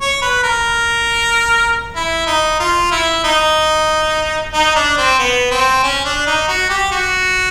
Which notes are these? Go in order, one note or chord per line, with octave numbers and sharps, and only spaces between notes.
C#5
B4
A#4
E4
D#4
F4
E4
D#4
D#4
D4
C4
B3
C4
C#4
D4
D#4
F#4
G4
F#4